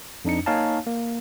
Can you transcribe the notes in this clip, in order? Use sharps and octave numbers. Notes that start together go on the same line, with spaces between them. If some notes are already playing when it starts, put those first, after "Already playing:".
F2 D4 D#4 C#7
A#3 D#4 C#5 F5 G#5 A5
A#3